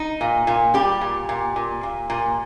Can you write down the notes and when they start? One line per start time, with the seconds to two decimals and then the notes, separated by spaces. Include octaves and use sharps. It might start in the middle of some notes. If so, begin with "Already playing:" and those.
Already playing: D#4
0.21 A#2
0.47 A#2
0.74 G3 G4
1.01 A#2
1.29 A#2
1.56 A#2
1.83 A#2
2.10 A#2